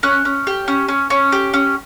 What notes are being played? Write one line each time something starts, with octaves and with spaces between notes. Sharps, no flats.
C#4 F#6
C#4
G4
C#4
C#4
C#4
G4
C#4